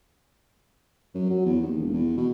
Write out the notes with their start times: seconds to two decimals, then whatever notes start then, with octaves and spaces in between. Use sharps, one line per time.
1.15 F#2
1.30 F#3
1.45 E2
1.62 D#2
1.78 E1
1.94 E2
2.17 B2